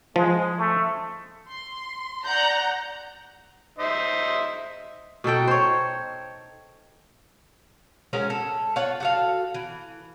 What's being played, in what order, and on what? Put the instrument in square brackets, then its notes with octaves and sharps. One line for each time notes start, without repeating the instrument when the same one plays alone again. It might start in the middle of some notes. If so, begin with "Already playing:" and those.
[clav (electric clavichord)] F3 [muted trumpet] G#3
[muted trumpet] A3
[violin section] C6
D5 F#5 A#5 G6
[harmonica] D#4 C5 E5
[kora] B2 D#4 A4 G5
C5 C#5
[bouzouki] G#3 C#4 F#4 A#4
A4
F4 C#5 F#5
F#4 A4 F5
E3